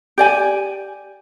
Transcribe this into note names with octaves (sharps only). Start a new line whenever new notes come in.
G4 D5 G#5